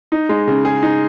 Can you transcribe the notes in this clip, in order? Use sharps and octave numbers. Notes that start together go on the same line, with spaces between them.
D#4
G#3
C#3
G#4
D#4